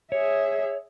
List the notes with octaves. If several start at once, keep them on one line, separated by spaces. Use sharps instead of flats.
G#4 C#5 E5